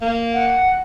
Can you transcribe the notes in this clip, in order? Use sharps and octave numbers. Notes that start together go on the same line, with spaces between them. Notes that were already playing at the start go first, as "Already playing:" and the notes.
A#3
F#5